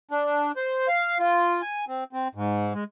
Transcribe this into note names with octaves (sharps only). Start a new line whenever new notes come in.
D4
C5
F5
F4
G#5
C4
C4
G#2
G#3